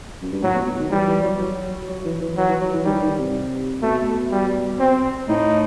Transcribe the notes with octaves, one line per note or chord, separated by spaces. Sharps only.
F#2
G2
A2 F#3
B2
B2
D#3
E3 G3
E3
F#3
F#3
F#3
E3
E3
E3 F#3
E3
F#3
E3
D#3 G3
E3
D#3
C3
B2 A3
G3
C4
A2 D#4